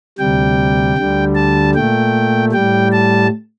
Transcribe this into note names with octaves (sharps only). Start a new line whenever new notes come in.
D2 C3 G3 G5
D2 D3 G3
A5
A#2 A3 G5
A2 G3 G5
A5